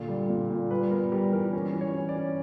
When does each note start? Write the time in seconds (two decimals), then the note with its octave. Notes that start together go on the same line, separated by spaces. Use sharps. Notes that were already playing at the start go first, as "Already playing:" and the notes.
Already playing: A#2 D3
0.08 G3
0.29 A#2
0.50 A#2
0.71 G3 B4
0.91 B3 A#4
1.12 G3 G4
1.33 E3 A#4
1.53 C#4
1.74 E3
1.81 C#5
1.94 C#4
2.09 D5
2.16 C#4